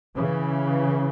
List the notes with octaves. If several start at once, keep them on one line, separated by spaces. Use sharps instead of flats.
C#3 E3